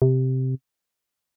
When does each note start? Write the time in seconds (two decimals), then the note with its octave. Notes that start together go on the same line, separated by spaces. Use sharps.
0.02 C3